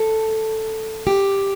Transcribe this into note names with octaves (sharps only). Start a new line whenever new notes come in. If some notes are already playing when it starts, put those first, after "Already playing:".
Already playing: A4
G4